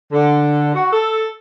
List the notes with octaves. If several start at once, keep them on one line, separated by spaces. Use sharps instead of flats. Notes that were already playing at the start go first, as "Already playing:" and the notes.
D3
F#4
A4